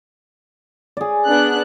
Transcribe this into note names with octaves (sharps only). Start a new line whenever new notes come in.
G#4 D5
B3 D4 F#6